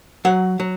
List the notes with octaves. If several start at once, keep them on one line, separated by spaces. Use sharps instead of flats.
F#3 F#5
F#3